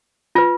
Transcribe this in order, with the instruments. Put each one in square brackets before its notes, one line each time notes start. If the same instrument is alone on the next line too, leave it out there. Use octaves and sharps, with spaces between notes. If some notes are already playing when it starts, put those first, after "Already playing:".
[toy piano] F4 B4